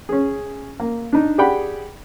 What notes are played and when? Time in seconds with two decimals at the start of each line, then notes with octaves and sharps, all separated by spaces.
0.09 C#4 G#4
0.80 A#3
1.13 D4 D#4
1.38 G4 G#4 D5 F#5 G5 B5